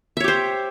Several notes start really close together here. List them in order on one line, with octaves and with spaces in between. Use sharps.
E5 C#5 G4 C5